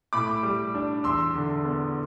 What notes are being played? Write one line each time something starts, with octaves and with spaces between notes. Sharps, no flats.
A2 B5 D6
G3
D4
E2 C6 E6
D3
B3